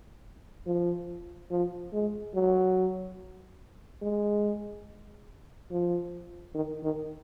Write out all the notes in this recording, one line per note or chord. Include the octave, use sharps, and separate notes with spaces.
F3
F3
G#3
F#3
G#3
F3
D#3
D#3